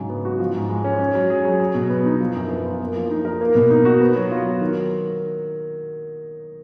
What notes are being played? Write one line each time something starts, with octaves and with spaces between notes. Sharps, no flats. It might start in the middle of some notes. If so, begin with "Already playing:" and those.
Already playing: G#2 C#3 F#3
B3
F#4
F3
G#2
G#3
C#4
C#4
F#3
G#4
F#3
F#3
B2
B3
D#4
F3
F#2
B3
F4
A#3
F3
D#4
A#4
A#3
B2
D#4
F#4
B3
F#3
F4
F#3
D#3